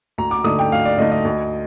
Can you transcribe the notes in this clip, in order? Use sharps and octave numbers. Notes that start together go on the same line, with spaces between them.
D2 A#5
D6
D3 A3 D#4 D#6
G5
D2 F5
D5
D3 A3 D#4 D#5
D#5
D2